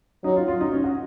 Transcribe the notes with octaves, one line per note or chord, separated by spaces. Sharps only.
F#3 D#4
F4
F4
D#4
C#4
F#4